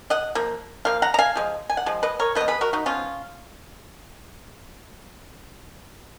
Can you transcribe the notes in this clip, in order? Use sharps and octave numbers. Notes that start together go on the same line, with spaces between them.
D#5 F#5
F3 A#3
F3 A#3 F5
F#5 A#5
A#5
F5 G#5
F3 G#3
G#5
F#5
F3 G#3
B4 D#5
A#4 C#5
F3 B4 D#5
B3
G#4 B4
F#4 A#4
D#4 F#4
F3 B3 C#4 F4